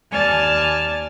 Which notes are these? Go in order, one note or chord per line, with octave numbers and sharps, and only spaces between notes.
D#2 D5 G#5 A5 F6